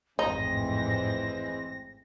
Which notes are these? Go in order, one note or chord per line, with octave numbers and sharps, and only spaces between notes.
A1 F2 G#2 E3 G#3 C4 D#4 A#6